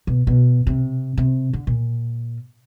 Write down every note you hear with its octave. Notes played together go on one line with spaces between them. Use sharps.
B2
B2
C3
C3
D3
A#2